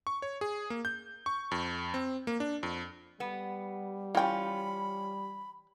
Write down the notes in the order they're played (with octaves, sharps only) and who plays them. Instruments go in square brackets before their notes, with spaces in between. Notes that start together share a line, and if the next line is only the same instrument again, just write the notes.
[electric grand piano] C#6
C#5
G#4
A#3
G6
C#6
F2
C4
A#3
D4
F2
[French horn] G3 [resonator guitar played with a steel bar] B3
[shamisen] E3 G5 [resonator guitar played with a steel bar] C#4 F4 [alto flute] B5